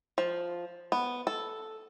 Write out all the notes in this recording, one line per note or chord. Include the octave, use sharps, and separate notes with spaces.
F3
B3
A4